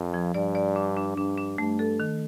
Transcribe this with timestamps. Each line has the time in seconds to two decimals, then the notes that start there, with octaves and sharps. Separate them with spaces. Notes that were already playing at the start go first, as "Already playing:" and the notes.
Already playing: F2
0.14 F3
0.34 G2 D5
0.55 D5
0.76 D4
0.97 D4
1.17 G2 D4
1.38 D4
1.58 G2 A3
1.79 A4
2.00 D#3